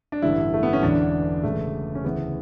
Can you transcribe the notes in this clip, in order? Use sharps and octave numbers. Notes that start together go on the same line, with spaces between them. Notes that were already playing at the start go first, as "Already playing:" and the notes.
D4
A1 G2 D3 E4
A3
B3
C#4
E1 E2 D3 D4
E1 E2 C#3 A3
C#4
D2 C#3 E3 B3